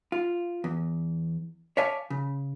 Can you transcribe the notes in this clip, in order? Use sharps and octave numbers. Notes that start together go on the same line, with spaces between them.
F4
E2
C#5 D5 E5 F5 G#5 A5
C#3